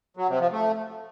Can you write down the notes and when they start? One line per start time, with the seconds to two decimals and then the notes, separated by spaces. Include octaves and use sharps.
0.17 F#3
0.28 C3
0.40 F3
0.52 A3